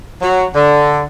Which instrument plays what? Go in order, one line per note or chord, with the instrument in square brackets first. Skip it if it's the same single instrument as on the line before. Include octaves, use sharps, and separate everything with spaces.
[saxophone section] F#3
D3